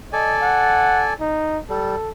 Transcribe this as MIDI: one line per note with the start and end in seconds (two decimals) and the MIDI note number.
0.13 1.14 69
0.13 1.14 74
0.13 0.36 75
0.13 1.14 80
0.42 1.05 78
1.20 1.59 63
1.70 1.96 55
1.70 2.10 69